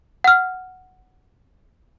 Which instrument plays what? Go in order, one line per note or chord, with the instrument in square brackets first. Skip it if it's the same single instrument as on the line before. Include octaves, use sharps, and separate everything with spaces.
[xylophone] F#5 F6